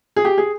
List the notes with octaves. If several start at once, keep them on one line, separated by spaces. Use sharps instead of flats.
G#4
G4
G#4